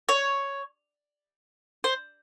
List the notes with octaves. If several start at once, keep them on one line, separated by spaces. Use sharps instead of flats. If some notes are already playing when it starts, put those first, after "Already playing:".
C#5
C5